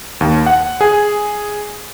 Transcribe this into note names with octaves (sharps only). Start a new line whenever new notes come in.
D#2
F#5
G#4